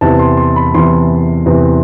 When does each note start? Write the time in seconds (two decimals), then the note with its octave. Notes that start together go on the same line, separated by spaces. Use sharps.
0.01 E2 C3 E3 A5
0.19 C6
0.37 C6
0.56 B5
0.74 E2 C3 E3 C6
1.46 E2 C3 E3